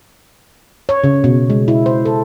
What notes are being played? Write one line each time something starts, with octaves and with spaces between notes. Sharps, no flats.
C#5
C#3
B2
G#3
E4
C5
A4